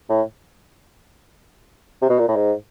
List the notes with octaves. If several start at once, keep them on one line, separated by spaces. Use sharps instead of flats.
A2
C3
B2
A#2
A2
G#2